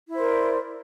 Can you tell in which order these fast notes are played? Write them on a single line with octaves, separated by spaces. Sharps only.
E4 C5 A#4 D5